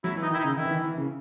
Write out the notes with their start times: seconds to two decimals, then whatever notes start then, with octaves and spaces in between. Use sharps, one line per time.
0.04 F#3 E4
0.17 E3
0.22 D#4
0.31 D#3
0.34 E4
0.39 D#4
0.44 C#3
0.57 D#3 E4
0.65 E3
0.71 D#3
0.84 E3
0.97 C#3